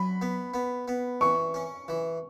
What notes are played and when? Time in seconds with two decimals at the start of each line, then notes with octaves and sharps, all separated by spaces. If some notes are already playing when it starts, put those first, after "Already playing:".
Already playing: F#3 B5
0.22 B3
0.54 B3
0.88 B3
1.21 E3 C#6
1.54 C#4
1.88 E3